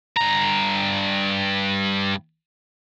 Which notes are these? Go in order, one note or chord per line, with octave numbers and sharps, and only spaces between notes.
G2 A#5